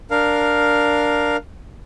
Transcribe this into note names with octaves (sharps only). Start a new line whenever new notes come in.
D4 A#4 F5